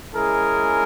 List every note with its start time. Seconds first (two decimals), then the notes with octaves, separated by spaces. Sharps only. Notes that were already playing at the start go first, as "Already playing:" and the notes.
0.15 G#3 C#4 E4 G#4 A#4